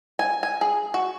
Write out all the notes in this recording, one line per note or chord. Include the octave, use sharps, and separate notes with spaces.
G#5
G#5
G#4
F#4